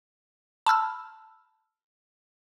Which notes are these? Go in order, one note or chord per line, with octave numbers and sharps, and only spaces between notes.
A5 B5 E6 F6